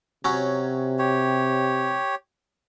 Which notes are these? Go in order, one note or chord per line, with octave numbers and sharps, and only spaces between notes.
C3 F#3 C#4
G4 C#5